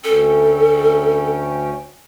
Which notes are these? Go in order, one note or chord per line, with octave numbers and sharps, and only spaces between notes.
D2 C#4 A4 G5